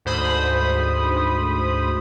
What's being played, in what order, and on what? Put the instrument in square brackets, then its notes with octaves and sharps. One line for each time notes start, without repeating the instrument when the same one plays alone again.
[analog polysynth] D2 G#2 C5 B5 D#6